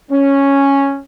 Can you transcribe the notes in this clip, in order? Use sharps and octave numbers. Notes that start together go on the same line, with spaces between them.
C#4